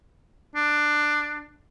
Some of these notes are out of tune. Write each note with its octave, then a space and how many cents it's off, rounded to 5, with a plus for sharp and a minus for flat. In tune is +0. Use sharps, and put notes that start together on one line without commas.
D4 +15